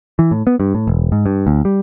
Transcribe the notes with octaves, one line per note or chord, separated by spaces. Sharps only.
E3
A2
B3
G2
A2
E1
G#2
G2
D2
G3